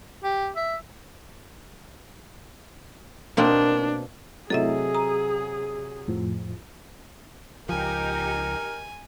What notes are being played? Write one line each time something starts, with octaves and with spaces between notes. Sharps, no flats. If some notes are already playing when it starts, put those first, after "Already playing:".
G4
E5
B2 A#3 C4 D4
C3 F#3 A3 E4 G#4 A4 D#5 E5
A#5 D#6
F2 A2 F3
C#2 F3 D#4 G4 A#4 G#5